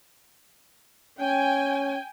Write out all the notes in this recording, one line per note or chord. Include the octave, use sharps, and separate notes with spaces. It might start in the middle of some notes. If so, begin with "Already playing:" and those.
C#4 G5 G#5